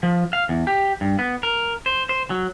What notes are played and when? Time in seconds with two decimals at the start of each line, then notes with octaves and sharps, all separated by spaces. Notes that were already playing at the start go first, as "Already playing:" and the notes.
0.03 F3
0.33 F5
0.49 E2
0.67 G4
1.01 G2
1.19 B3
1.43 A#4
1.86 C5
2.09 C5
2.30 F#3